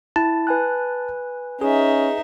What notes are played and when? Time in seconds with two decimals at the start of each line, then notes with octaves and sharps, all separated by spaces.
0.16 E4 A5
0.47 B4 G#5 F#6
1.61 C#4 D#4 G#4 E5